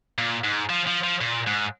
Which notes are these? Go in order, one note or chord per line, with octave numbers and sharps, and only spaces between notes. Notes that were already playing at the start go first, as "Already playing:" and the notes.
A#2
G#2
F3
F3
F3
A#2
G#2